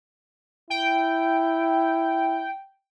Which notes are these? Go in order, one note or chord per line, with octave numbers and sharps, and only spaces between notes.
E4 G5